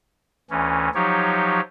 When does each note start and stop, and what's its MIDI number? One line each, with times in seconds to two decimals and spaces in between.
0.50 0.89 38
0.50 0.89 52
0.50 0.89 61
0.94 1.61 53
0.94 1.61 54
0.94 1.61 63
0.94 1.61 67
0.94 1.61 73